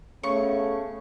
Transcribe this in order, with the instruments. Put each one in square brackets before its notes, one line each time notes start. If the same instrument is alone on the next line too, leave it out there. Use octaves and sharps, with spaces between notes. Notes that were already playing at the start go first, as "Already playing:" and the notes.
[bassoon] C#3 [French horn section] A3 B3 C#4 [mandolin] C#6